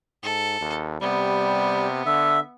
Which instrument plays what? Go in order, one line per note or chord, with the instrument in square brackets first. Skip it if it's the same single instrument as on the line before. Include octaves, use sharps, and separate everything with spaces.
[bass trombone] G#2 [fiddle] A4
[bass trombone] D#2
[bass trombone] C3 [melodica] G3 [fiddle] B3
[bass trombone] D3 [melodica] E5